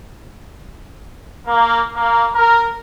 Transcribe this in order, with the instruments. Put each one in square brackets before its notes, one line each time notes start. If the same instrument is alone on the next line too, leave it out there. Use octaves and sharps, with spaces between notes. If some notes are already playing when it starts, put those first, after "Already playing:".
[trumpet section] A#3
A#3
A#4